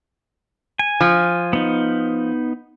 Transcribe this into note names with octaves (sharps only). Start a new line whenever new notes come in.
G#5
F3
B3 D#4